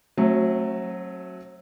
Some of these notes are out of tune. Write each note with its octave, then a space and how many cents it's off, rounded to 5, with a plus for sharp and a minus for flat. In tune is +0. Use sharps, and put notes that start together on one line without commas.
F#3 -5 A3 +0 C4 +45